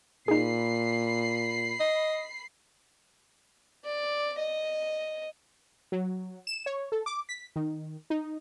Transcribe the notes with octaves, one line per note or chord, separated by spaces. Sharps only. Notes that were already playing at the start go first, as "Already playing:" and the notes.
A#2 D#4 G#4 B5 C7
D#5
D5
D#5
F#3
E7
C#5
A4
D6
B6
D#3
D#4